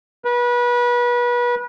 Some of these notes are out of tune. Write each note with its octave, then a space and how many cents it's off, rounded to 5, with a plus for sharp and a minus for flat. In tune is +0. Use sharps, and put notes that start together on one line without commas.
B4 -30